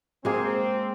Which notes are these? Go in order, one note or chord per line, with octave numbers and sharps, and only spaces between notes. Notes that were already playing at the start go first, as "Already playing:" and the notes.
G#3 A#3 C4 G#4